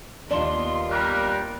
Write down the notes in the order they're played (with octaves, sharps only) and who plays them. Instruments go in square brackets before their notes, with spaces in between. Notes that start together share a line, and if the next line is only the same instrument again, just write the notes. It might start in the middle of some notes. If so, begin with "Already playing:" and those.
[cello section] D#2 B3 F4 [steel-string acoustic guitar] D4 D#4 [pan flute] C6
[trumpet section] G3 A#4 [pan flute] F#6